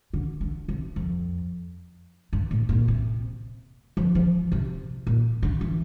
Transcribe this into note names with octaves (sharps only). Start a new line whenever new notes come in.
D3
D3
C3
F2
G2
A2
A#2
C3
F3
F3
C3
A#2
D3
E3